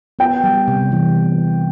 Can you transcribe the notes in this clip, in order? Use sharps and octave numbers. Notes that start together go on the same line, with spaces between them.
B3 G5
G3
C3
E3
B3